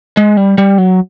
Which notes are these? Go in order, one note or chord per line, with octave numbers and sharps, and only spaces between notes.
G#3
G3
G3
F#3